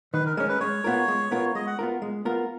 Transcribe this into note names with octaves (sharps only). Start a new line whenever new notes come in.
D#3 B4
A#4
G#3 C#4 A#4
B4
G#3 C#5
B3 F4 A#4
G#3
B3 F4 A#4
G#3 D#5
F#5
B3 F4 A#4
G#3
B3 F4 A#4